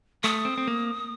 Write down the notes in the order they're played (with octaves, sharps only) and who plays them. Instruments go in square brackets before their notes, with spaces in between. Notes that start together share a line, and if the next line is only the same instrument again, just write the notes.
[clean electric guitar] A3 [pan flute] D#6
[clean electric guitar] C4
C4
A#3